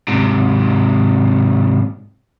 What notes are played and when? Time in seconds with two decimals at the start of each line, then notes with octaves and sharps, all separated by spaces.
0.08 G#2 C3